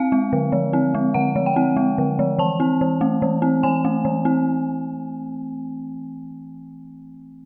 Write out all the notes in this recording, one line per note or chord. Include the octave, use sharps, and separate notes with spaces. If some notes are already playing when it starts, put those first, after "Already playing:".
Already playing: C4 F5
G#3
D3
F3
C4
G#3
D3 F#5
F3
G5
C4
G#3
D3
F3
E3 A5
C4
E3
A3
E3
C4
E3 G#5
A3
E3
C4